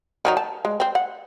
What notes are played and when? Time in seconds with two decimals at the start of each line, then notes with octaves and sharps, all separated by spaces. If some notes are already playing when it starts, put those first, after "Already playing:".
0.25 D#3 F#3 D#4
0.37 A5
0.65 G#3
0.80 C4 C5
0.95 F#5